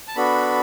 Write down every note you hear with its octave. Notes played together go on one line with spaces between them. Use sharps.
A5
B3 D4 F#4 A4 B5